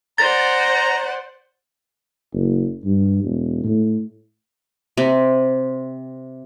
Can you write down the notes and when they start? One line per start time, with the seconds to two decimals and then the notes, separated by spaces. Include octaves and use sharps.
0.18 C5 D5 F#5 A#5 A6
2.33 F#1
2.85 G2
3.24 E1
3.64 A2
4.97 C3